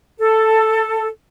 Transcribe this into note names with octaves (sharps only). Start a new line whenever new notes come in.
A4